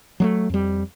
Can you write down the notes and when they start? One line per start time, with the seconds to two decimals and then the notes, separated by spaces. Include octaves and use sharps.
0.20 F#3 G#3 A3
0.50 F2 G3